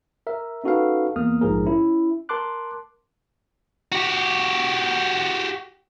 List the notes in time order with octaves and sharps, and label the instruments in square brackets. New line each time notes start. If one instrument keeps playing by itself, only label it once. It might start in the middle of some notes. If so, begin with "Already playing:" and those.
[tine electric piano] A#4 E5
C#4 D#4 F#4 A4 B4 F5
E2 A#3 D#6 F6
A#1 G#2 F3 G#4 A#4
C#4 E4
A#4 A5 C6 D6 F#6
[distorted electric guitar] F#4 G4